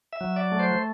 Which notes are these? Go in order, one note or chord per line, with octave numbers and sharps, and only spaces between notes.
E5
F#3
D5
A3
C5